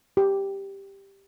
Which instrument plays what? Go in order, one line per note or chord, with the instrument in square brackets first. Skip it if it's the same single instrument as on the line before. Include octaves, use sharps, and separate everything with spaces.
[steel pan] G4